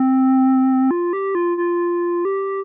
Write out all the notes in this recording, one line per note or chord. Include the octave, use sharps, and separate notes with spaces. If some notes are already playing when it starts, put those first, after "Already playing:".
Already playing: C4
F4
G4
F4
F4
G4